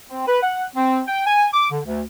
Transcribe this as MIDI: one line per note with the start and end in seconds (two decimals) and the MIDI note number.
0.10 0.23 60
0.27 0.40 71
0.43 0.64 78
0.76 1.01 60
1.07 1.23 79
1.26 1.48 80
1.54 1.67 86
1.71 1.80 50
1.86 2.02 38